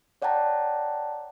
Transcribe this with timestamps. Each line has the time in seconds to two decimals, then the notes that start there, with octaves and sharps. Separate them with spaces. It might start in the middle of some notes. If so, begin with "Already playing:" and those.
0.22 C#5 D5 F#5 G5 A5 A#5